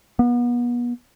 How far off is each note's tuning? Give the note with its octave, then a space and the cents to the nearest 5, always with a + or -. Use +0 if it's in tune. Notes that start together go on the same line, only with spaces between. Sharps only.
B3 -35